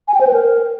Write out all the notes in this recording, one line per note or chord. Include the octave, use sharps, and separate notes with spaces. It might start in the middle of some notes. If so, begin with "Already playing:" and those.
G#5
G5
C5
B4
A#4